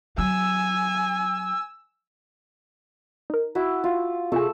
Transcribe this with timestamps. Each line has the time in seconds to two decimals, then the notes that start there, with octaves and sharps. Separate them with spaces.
0.18 F#3 G#5 E6
3.30 D#4 A#4
3.55 E4 F#4
3.84 F4
4.32 C3 A3 F4 G#4 C#6 E6